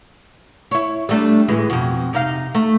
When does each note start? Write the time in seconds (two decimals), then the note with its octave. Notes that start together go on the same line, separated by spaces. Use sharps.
0.71 E4 C#5
1.09 G3 A3 D4
1.48 A2 E3 G#3
1.70 F2 B2
2.13 C3 D#4 F5
2.55 A3